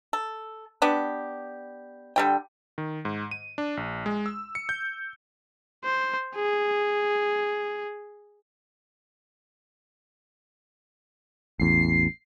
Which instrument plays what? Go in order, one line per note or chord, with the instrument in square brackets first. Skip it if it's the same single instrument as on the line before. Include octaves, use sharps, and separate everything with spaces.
[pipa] A4
B3 D4 G4
D3 G3 G5
[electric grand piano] D#3
G#2
D#7
D4
A#1
G#3
E6
C#7
G6
[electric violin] C5
G#4
[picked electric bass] A1 E2 [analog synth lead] C7